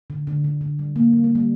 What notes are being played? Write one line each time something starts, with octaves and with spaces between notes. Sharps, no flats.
D3
D3
D3
D3
G3
A#3
G3
A#3
G3